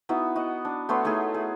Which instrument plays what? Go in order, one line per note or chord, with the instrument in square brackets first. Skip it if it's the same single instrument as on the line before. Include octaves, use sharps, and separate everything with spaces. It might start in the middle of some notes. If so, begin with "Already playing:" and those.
[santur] B3 D#4 E4 F#4
F#4 D#5 F#5
D4
A3 B3 C#5 C6
A3 D#4 E4 G#4
G#4